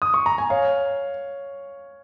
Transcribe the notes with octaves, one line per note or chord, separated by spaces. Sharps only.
D#6
C#6
A#5
G#5
C#5 F5